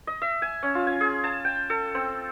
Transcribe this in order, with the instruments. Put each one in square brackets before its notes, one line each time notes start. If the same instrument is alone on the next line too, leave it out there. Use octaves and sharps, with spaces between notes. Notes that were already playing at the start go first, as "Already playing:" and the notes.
[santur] D#5
E5
G#5
C#4
F4
G#5
G#4
A5
G5
A4
C4